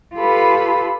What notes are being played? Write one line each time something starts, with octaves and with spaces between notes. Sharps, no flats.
F4 G4 A4 B4 B5